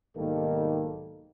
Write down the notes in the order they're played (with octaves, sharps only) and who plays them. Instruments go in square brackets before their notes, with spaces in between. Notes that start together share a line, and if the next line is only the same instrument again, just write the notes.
[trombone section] B1 G#2 D#3 G3 A#3 A4